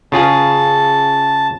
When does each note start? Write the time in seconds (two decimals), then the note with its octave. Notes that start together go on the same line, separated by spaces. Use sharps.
0.12 C#3 F4 G#4 A5